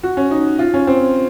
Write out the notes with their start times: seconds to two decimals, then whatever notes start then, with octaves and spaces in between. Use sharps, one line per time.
0.03 F#4
0.17 C#4
0.31 D#4
0.59 F4
0.74 C#4
0.87 C4